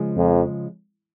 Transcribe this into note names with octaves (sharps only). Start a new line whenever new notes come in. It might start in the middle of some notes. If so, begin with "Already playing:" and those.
Already playing: C#3 F3 G#3
F2